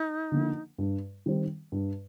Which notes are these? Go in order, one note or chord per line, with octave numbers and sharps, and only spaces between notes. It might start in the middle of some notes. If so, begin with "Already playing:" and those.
Already playing: D#4
D3 F3 A#3
G2
D#3 G3 C4
G2